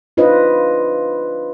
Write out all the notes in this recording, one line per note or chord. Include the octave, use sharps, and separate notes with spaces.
D4 F4 B4 C5 D#5